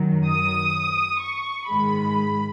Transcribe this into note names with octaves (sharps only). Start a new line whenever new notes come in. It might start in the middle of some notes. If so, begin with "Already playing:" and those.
Already playing: F#2 D#3 F#3
D#6
C#6
G#2 D#3 G#3 B5